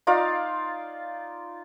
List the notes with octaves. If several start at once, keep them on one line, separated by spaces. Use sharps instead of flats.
D#4 F4 D5 F5